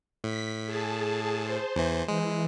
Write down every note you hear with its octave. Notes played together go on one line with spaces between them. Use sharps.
A2 B6
G#4 A5
C5
E2 E3
E3 G#3